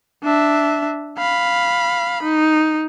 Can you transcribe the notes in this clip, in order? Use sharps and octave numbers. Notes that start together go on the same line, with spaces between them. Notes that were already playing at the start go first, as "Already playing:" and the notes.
D4 E5
F5 B5
D#4